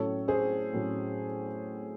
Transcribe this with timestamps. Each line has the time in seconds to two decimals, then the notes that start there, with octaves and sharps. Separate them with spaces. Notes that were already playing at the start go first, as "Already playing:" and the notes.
Already playing: A2 F#3 C#4 A4 C#5
0.28 G#4 C5
0.73 A2 F#3 C#4